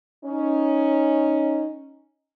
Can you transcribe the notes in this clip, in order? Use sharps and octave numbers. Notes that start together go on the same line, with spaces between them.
C#4 D#4